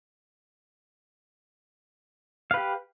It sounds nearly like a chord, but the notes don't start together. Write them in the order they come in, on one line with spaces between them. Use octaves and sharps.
F5 B4 G4